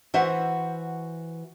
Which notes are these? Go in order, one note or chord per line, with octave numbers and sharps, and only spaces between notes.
E3 F#4 C5 E5 F#5